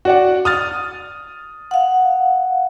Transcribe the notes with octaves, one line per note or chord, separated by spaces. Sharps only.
F#4 D5 F#5
D#6 F6 A6
F5 F#5